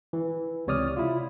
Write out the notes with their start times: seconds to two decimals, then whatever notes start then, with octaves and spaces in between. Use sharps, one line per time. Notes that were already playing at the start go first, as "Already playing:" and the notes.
0.13 E3
0.67 C#2 C3 C#5 D5 D#6 F6
0.97 E4 F4